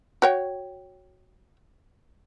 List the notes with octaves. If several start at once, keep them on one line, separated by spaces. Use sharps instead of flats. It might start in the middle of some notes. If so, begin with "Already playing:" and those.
F#4 C#5 G5